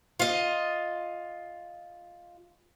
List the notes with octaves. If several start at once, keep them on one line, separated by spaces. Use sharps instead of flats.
F4 D#5